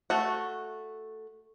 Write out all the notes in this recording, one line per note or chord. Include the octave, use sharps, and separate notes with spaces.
A3 F#4